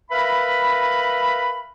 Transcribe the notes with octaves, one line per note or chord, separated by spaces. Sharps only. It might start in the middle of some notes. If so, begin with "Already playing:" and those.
A#4 B4 E5 F5 B5